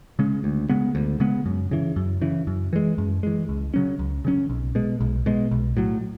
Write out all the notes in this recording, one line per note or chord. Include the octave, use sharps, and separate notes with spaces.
C#3 G#3 C#4
D2
C#3 G#3 B3
D2
C#3 G#3 B3
F#2
C#3 E3
F#2
C#3 E3
F#2
E3 G#3
F#2
E3 G#3
C#2
C#3 F#3 C#4
C#2
C#3 F#3 C#4
B1
B2 G#3
B1
B2 G#3
B1
A2 F#3